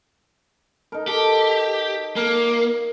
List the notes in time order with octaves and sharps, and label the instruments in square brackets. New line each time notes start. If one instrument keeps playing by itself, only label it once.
[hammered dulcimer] D#4 A#4
[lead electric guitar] G4 [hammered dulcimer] A4
[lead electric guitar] A#3 [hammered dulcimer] A#4